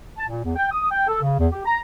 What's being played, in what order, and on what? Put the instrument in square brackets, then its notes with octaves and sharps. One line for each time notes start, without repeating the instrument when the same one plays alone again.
[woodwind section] A5
A#2
E2
G5
D#6
G5
A4
C#3
E2
G4
A#5